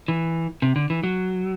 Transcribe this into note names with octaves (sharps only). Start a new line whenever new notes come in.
E3
C3
D3
E3
F#3